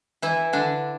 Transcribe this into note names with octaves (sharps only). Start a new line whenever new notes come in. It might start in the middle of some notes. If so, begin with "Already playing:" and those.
E3 E4
D3 D4